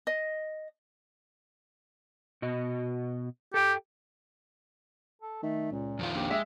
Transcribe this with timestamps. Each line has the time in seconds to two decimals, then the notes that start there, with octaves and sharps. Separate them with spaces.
0.07 D#5
2.42 B2 F#4 D#5
3.54 G4 A4 G5
5.22 A4
5.43 D#3 A3
5.72 C#2 A#2
5.99 F2 D#3 F4
6.15 A#1 G4
6.30 G#3 E5